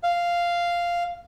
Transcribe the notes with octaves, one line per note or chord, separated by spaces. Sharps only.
F5